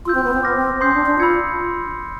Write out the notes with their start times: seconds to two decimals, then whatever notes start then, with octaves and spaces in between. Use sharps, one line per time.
0.05 F4 C6 E6 G6
0.15 C4
0.24 B3
0.34 C4
0.43 B3 D6 F6 A#6
0.56 C4
0.81 C#4 C6 D#6 G6 C7
0.94 D4
1.06 D4
1.19 F4 B5 E6 G#6 C#7